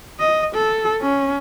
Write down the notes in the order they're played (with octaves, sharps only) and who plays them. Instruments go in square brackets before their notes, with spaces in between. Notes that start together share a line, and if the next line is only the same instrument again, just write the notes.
[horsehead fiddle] D#5
A4
C#4